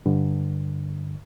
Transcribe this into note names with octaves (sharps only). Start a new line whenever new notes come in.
G2 D3